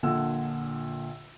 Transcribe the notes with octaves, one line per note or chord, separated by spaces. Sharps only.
A#1 A#2 D3 A4 F#5 E6